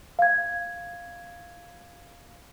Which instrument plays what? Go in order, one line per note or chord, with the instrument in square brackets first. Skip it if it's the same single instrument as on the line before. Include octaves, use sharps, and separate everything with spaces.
[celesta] F5 G#6